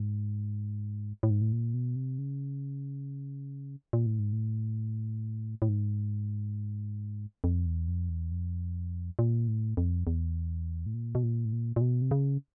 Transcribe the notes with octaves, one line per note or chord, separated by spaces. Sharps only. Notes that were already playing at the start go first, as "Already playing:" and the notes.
Already playing: G#2
A2
G#2
A2
A#2
B2
C3
C#3
A#2
A2
G#2
A2
A2
G#2
F2
E2
F2
E2
F2
A#2
A2
F2
E2
A2
A#2
B2
A#2
A2
A#2
A#2
B2
C3
C#3